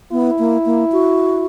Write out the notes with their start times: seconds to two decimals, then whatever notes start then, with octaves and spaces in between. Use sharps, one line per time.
0.12 B3 E4
0.39 A#3
0.66 A#3
0.92 F#4